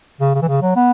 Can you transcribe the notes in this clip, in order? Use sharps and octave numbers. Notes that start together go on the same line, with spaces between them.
C#3
C#3
E3
C#3
F#3
B3